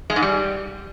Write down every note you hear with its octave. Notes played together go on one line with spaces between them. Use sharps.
G#3
G#2
G3